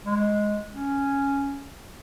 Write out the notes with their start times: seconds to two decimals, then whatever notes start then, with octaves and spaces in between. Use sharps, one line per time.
0.05 G#3
0.73 C#4